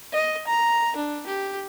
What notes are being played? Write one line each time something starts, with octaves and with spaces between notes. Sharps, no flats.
D#5
A#5
D4
G4